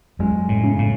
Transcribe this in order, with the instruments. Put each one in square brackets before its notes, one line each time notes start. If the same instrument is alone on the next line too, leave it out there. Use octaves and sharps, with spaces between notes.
[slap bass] F#2 [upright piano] G#3
[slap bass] A2
[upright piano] C#3
[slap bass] A2